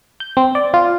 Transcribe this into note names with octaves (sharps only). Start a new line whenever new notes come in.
G6
C4
D5
F4